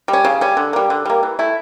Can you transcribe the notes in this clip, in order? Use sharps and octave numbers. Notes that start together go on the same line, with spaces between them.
G3
C#4
C#3
G3 C#4
D3
G3 A#3
D3
G3 A#3
E3
A3 E4